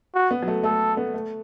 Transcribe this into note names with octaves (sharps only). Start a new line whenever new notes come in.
F#4
B3
F#3
A3
A3 A4
B3
A3